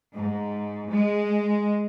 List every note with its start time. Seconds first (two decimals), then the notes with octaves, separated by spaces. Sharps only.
0.14 G#2
0.89 G#3